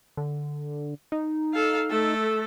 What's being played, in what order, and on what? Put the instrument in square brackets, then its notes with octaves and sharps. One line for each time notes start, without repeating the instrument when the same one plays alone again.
[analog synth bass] D3
D#4
[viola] A4 F5
A3 A4